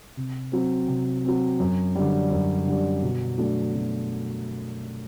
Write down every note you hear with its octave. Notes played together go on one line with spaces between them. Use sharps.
C3
F#3 C4
C3
F#3 C4
F#2
D3 G3
F#2
D3 G3
B2
F#3 A3 D4
B2